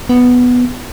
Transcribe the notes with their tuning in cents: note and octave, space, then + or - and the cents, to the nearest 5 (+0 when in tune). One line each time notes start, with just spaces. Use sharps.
B3 +0